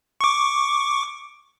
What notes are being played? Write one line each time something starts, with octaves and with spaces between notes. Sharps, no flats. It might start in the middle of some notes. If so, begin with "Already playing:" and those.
C#6 D6